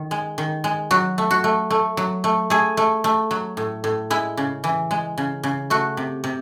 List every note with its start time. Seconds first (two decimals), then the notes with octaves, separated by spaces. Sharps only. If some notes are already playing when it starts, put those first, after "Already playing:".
Already playing: D#3
0.11 G#3
0.38 D#3
0.64 G#3
0.91 F#3 F#4
1.18 A3
1.31 F#4
1.44 A3
1.70 A3
1.97 F#3
2.24 A3
2.50 A3 G#4
2.77 A3
3.04 A3
3.31 F#3
3.57 A2
3.84 A2
4.10 G#3 E4
4.37 C#3
4.64 E3
4.91 G#3
5.18 C#3
5.43 C#3
5.70 A3 F#4
5.97 C3
6.24 C3